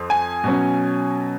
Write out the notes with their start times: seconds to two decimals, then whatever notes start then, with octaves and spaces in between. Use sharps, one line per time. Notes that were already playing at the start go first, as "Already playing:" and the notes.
Already playing: F2 F3
0.10 G#5
0.44 B2 F#3 C#4